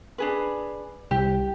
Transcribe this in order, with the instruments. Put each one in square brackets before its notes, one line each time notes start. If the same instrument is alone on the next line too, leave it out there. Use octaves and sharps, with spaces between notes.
[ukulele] D4 G#4 B4
[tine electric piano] C2 [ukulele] G4